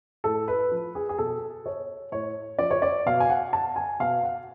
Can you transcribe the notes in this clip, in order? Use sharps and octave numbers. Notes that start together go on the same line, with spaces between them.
A2 A4
B4
F3
G#4
G#4
B2 A4
C#5
A2 C#5
F3 D5
C#5
D5
B2 F5
G#5
F#5
A5
G#5
B2 F5
F#5